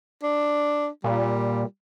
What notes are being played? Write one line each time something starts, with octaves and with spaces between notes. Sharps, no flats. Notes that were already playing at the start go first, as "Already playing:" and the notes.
D4
A#2 G3